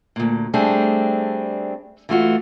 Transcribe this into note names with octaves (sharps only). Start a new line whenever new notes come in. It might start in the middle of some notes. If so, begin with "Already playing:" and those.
D2 A#2
G3 A3 C4 D4 G#4
E3 A3 F4 F#4